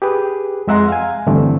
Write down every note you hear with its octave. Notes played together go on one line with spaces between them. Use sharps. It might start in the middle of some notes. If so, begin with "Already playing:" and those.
G4 G#4 B4
F2 G#3 E5 F#5 A#5 C6
F5 G#5
G2 D3 E3 A3 C4